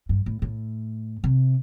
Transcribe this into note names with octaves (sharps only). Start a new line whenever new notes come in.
G2
A2
A2
C3